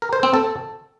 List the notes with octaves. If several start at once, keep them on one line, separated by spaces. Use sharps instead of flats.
A#4
C5
C4
A4